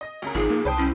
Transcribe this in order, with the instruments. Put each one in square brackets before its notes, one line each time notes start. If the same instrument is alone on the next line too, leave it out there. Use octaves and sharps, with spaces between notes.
[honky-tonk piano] D#5 A#6
D2 C#3 A#4
[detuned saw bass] G#1 [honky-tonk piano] E2 A#2 F3 [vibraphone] D#4 [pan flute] G#4
[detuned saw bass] A#3
[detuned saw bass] C2 [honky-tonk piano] B4 C5 G5 [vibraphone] A5 D#6
[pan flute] C#4 [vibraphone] E4